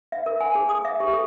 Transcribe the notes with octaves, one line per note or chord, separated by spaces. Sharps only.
E5
A#4
G#5
G#4
D#6
E5
G4
A4